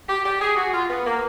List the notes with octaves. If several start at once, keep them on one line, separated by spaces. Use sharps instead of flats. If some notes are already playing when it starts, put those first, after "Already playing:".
G4
G4
G#4
F#4
F4
B3
A#3